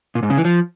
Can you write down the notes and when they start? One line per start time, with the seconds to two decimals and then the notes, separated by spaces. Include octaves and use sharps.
0.15 A#2
0.23 G#2
0.30 C#3
0.37 E3
0.45 F3